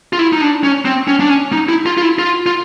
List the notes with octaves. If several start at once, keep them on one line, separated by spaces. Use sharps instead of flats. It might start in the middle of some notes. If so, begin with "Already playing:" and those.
F4
E4
D#4
D4
C#4
C4
C#4
D4
C#4
D#4
E4
F4
F4
E4
F4
F4